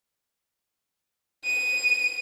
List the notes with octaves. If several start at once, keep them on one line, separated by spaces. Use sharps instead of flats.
D#7